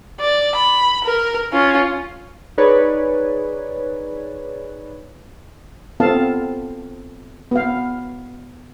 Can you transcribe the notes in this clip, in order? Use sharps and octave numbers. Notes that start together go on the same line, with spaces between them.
D5
B5
A#4
C#4 F4
D#4 G#4 B4 C#5 D5
B3 C4 F4 A4 F5 A5
B3 F5